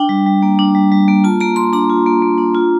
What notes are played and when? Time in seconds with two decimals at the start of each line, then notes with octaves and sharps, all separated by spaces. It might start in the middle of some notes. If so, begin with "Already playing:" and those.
Already playing: D4 G5
0.09 G3
0.26 G3
0.42 A#3
0.59 D4
0.75 G3
0.92 G3
1.08 A#3
1.24 F4 A5
1.40 A#3 A#5
1.56 A#3 C6
1.73 D4 A#5
1.90 F4
2.06 A#3
2.22 A#3
2.38 D4
2.55 F4